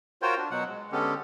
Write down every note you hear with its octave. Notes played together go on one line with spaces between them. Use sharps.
F4 F#4 A#4 C5 C#5 G5
D4
B2 F#3 F#5
G#3
D3 G#3 B3 C#4 G4 A4